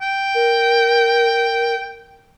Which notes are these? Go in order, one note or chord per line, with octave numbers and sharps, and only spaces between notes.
G5
A#4